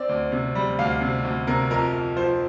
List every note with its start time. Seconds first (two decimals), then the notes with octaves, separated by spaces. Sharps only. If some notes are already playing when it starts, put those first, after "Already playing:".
Already playing: C4 D5
0.09 D2
0.32 C3
0.55 G3
0.79 D2 F5
1.01 C3
1.25 D2
1.47 C3 A#4
1.70 F2 A#4
1.93 F2
2.16 F3 C5